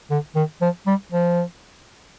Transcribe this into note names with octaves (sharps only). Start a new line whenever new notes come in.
D3
D#3
F3
G3
F3